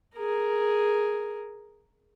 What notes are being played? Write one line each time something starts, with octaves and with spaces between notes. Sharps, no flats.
G#4 A#4